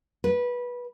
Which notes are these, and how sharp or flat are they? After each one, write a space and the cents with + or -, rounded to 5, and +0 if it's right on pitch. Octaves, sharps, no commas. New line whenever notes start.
B4 -20